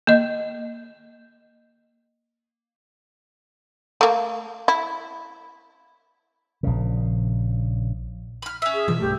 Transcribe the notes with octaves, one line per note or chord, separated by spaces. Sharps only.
A#3 D#5
A3 A#3
E4
A#1 C#3
B5 F6
C#4 E5
G#4
B2 E3 F3 E5
B1 G2 A3 G4